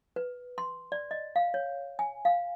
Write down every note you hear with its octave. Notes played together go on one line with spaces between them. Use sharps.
B4
C6
D5
D#5
F5
C#5
G#5
F5